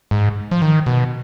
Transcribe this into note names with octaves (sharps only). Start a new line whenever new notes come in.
G#2
F3
D#3
B2